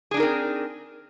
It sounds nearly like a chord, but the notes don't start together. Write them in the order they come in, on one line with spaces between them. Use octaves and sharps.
G#4 D4 D#4 A#4 C4